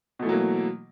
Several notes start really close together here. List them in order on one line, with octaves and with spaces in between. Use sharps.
B2 A3 E3 F#3 A#3